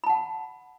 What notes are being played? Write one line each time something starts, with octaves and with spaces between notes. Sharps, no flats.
F#5 A5 B5